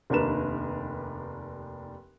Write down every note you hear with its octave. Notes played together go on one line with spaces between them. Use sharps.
F1 D#2 D4 A#4 B4 E7